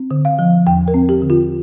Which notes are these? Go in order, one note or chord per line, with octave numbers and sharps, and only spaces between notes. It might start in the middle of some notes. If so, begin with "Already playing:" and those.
Already playing: C4
D3
F5
F3
E2 G5
A#4
C4
G4
D3
F4